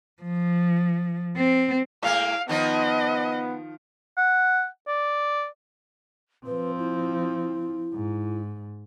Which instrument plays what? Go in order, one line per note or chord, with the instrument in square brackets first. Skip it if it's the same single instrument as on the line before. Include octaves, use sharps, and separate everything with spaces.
[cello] F3
C4
[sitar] A2 G#3 A#3 [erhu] F5
[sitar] D#3 F3 D#4 [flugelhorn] B3 [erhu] D#5
[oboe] F#5
D5
[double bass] F3 C4 [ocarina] B4
[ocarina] E4
[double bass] G#2